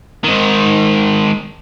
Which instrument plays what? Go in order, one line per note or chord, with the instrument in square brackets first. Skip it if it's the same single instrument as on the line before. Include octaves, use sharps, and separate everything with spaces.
[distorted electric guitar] G#2 D#3